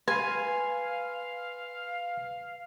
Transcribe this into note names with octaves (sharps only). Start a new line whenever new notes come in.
B4 F5 G#5 C6